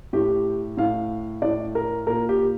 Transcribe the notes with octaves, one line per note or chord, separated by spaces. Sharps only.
A2 G4
A2 F5
A2 D5
A#4
A#2 A#4
G4